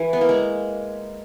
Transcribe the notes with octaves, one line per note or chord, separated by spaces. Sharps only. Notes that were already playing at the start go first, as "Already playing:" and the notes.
Already playing: E3
B3
A#3
G#3